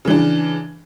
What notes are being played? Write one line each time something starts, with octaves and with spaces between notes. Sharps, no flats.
C#3 E3 D4